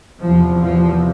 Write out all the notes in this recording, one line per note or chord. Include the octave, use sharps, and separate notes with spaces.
E2 C3 F3
F3